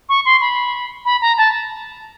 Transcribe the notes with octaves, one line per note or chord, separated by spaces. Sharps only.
C#6
C6
B5
B5
A#5
A5